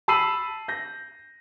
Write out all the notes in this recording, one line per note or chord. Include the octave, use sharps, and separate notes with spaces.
A5 B5 E6 C7 D#7 F#7
G6 A#6